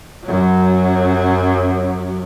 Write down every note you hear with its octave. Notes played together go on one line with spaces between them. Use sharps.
F#2 F#3